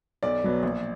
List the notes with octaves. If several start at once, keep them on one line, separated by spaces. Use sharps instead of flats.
B1 D5
B2 F#3 B3
A#1